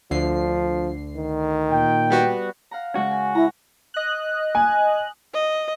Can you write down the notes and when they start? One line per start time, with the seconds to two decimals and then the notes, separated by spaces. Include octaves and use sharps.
0.11 D2 D3 F3 C7
1.16 D#3
1.70 A#2 G5
2.10 G3 B3 F#4
2.71 F5 F#5 A#5
2.95 C#3 G#3 F#4
3.11 G#5
3.35 E4 A#5
3.94 D#5 F#6
4.55 G#5
5.34 D#5